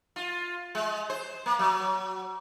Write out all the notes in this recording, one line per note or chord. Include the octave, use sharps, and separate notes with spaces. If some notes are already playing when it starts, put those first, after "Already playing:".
F4
G#3
C5
A#3
F#3